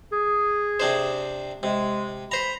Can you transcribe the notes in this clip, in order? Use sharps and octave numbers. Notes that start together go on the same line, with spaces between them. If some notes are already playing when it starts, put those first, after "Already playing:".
G#4
C3 D4 C5
C3 G#3
C5 A#5 B5